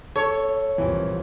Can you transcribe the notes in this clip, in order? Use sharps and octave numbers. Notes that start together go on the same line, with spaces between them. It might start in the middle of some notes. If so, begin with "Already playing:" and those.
A4 C#5
C2 F2 A#2 E3